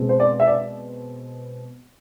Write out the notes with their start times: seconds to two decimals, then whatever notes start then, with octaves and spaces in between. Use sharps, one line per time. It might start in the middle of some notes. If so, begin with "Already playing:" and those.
Already playing: B2 G#3 C4
0.09 C5
0.20 D5
0.40 E5
0.47 D5